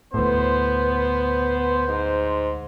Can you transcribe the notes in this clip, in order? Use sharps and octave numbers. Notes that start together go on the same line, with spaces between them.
D2 A2 B3 C5
G#2